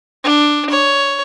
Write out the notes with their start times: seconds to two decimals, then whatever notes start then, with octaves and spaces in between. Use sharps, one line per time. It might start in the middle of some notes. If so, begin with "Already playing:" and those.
0.24 D4
0.70 C#5